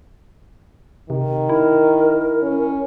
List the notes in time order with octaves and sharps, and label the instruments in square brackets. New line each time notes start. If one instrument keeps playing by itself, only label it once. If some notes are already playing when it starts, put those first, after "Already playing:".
[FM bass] C3 [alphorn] D#3
[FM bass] E4 [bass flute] A#4
[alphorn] C#4